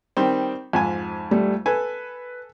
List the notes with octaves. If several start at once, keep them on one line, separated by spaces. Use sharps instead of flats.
D#3 G3 C4
F2 G#2 G#5
G3 A3
A4 B4 G#5